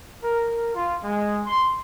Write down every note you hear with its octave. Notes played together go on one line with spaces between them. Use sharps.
A#4
F4
G#3
C6